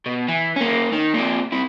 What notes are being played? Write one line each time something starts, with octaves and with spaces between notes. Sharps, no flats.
B2
E3
A#3 C#4
D#3
A#2 C4
C3 E4